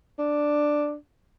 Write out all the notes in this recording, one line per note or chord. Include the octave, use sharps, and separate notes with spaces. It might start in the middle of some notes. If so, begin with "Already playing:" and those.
D4